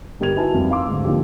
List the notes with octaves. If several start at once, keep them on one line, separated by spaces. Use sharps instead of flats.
G1 G3 G4 A#4 G#6 F7
D#4 E4 F#4 B4 G#5 A5
F2 G3
F5 C6 D6 E6
D2 G#2
D3 F3 A#3 D#4 G4